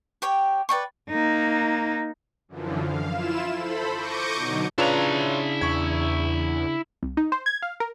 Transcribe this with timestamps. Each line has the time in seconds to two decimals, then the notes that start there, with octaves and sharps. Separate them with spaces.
0.22 G4 C#5 G5
0.69 B4 D5 G5 C#6
1.10 A#3 D#4
2.48 F#2 D3 E3 F3
2.79 F5
3.10 E4 F4 E7
3.53 A4 C5 B5
3.93 C#6 D6 G6 A#6 C#7 D#7
4.35 B2 D3 F#3 D#4
4.78 C#3 D4 E4 F4 B4 C#5 A#5
5.61 E2 C#6 G#6
7.03 C2
7.17 D#4
7.32 C5
7.46 G#6
7.62 F5
7.80 A#4